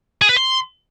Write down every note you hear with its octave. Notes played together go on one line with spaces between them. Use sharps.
G#4
B4
C6